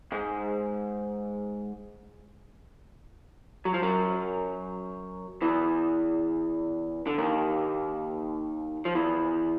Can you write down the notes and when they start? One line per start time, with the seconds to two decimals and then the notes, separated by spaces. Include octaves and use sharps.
0.12 G#2 G#3
3.65 F#3
3.74 F3
3.82 F#2 F#3
5.42 E2 E3
7.07 D3
7.18 D#2 D#3
8.85 F3
8.95 E2 E3